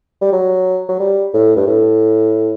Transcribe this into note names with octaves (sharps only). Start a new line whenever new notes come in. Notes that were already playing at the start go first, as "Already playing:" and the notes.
G3
F#3
F#3
G3
A2
G2
A2